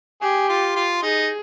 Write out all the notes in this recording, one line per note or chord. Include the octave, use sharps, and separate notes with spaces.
G4 G#4
F4
F4
D#4 G#4